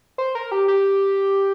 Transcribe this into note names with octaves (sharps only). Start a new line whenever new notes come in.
C5
A#4
G4
G4